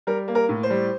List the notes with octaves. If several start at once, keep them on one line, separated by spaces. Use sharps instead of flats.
G3 A#4
A#3
A#4
A2
C5
G3